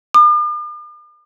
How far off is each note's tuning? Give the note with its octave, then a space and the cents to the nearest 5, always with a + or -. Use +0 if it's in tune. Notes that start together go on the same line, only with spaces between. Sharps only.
D6 +45